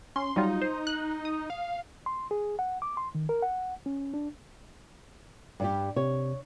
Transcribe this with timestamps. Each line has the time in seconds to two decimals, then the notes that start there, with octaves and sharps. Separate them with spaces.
0.16 C#4 C6
0.36 F#3 G3 D#4 F4
0.62 C5
0.87 F#6
1.25 D#6
1.50 F5
2.06 C6
2.31 G#4
2.59 F#5
2.82 D6
2.97 C6
3.15 D#3
3.29 A#4
3.42 F#5
3.86 C#4
4.14 D4
5.60 G2 G3 G4
5.96 C3 C#5